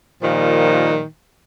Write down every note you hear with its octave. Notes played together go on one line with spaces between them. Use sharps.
A#2 D#3 F3 G3